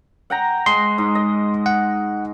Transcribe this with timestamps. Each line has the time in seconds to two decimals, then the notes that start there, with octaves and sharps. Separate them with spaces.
0.30 F#5 G5 A#5
0.66 G#3 C6
0.98 G#2
1.15 D#5
1.66 F#5